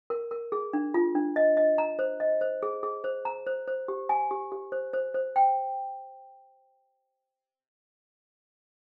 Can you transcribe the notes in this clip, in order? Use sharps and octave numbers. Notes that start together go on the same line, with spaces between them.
A#4
A#4
G#4
D4
F4
D4
D#5
D#5
A#5
C5
D#5
C5
G#4
G#4
C5
A#5
C5
C5
G4
G#5
G4
G4
C5
C5
C5
G5